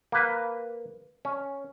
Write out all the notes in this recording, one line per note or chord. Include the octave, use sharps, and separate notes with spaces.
A#3 B4
C#4